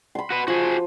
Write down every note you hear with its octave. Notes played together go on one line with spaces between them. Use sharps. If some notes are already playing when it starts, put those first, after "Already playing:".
B5 C6
F#4 B4
F3 F#4 G#4